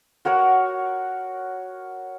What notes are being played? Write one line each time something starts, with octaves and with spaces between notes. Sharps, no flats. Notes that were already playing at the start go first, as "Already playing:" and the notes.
F#4 A#4 C#5 F#5